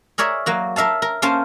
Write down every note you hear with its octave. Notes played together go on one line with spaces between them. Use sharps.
G#4 A#4 C#5 D5 E5
F#3 A#3 F#4
A#4 E5 F5 A5
A#4
A#3 C#4 A#4 C5 A5